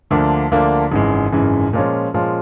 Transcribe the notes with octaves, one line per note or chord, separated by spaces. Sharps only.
D2 D3 F3 A#3 D4
D2 D3 F3 A#3 D4
G#1 F#2 C#3 E3 G#3
G#1 F#2 C#3 E3 G#3
A#2 F3 G#3 C#4
A#2 F3 G#3 C#4